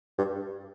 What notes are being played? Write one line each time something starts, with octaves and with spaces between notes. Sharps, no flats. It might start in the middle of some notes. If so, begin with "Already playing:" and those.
G2